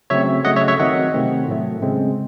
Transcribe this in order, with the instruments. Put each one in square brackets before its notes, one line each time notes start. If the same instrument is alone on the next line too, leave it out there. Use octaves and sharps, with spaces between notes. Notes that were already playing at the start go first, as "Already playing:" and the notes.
[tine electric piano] C#3 F#3 A3 C4 C#5 E5
C#3 F#3 A3 D#5 F#5
C#5 E5
C#5 E5
D#3 F#3 C4 D#5 F#5
C3 D#3 A3 C4
A2 F#3 A3
C#3 G#3 C4